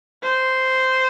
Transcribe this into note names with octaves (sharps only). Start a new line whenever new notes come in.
C5